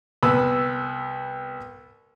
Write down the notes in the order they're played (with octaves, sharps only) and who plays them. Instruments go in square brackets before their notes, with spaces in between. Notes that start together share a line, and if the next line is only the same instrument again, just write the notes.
[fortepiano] C2 B3 B5 E6